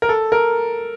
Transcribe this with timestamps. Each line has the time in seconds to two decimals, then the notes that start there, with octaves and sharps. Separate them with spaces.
0.02 A#4
0.09 A4
0.32 A#4